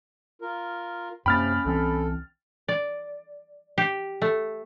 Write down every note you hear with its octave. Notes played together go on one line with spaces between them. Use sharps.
F4 A#4
F#2 C3 A#3 C#4 G5 B5 F6 A6
C2 E3 C4 A4
D5
G4
A3